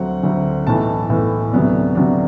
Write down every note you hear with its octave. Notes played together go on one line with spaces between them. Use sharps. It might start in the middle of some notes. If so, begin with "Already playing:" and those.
Already playing: D2 D3 F#3 C4 F#5
D2 D3 F#3 C4
B1 A2 E3 A5
B1 A2 E3
D2 C3 F#3 B3 D4
D2 C3 F#3 B3 D4